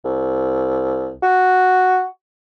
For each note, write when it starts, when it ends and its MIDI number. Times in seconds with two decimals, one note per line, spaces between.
0.05 1.14 36
1.22 2.05 66